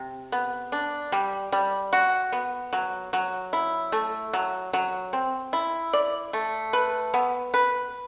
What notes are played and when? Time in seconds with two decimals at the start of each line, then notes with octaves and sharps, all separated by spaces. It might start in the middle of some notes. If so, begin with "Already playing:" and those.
Already playing: C3
0.32 B3
0.72 D4
1.12 G3
1.52 G3
1.93 F#4
2.32 B3
2.73 F#3
3.13 F#3
3.53 E4
3.92 A3
4.33 F#3
4.73 F#3
5.13 C4
5.53 E4
5.93 D5
6.33 A3
6.73 B4
7.14 B3
7.54 B4